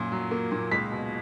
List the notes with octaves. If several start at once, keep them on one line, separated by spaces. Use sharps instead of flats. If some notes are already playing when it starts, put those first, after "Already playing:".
Already playing: F#2 A#2
F#3
A#3
A#2
C#2 B6
B2